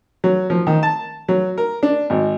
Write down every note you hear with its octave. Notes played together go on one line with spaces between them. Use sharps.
F#3
F3
D#3
A5
F#3
A#4
D4
G#1